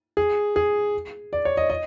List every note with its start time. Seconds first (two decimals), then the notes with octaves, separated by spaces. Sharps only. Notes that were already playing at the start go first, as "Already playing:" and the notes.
0.17 G#4
0.56 G#4
1.33 D5
1.45 C#5
1.57 D#5
1.70 D#5